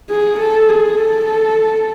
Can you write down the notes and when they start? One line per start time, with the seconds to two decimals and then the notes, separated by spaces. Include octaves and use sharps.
0.10 G#4
0.39 A4
0.68 G#4
0.97 A4